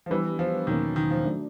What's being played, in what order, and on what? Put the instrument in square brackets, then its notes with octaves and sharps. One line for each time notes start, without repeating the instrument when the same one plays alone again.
[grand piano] F3
[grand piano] E3 [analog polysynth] G3 B3 D4 G4 B4
[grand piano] F3
[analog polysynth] E2 B2 F#3 A#3 C#4 [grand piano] D#3
[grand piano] D#3
F3
[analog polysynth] F#3 A3 D4